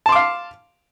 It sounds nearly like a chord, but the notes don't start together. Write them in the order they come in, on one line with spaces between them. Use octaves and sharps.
A5 C6 D6 F5